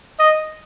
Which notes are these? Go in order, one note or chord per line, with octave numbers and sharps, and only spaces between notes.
D#5